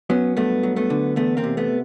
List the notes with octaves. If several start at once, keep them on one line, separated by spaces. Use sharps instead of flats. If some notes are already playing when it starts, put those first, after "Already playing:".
F#3 B3 C#4
G2 A3 B3
F#3
A3 B3
D3
E2 A3 B3
A#3 C4
C3
A3 B3